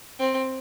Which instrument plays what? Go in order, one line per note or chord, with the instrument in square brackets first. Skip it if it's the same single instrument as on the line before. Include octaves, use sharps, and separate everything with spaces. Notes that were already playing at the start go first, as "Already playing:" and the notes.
[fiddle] C4